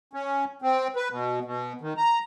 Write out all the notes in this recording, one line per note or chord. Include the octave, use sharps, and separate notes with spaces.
C#4
C4
B4
B2
B2
D#3
A#5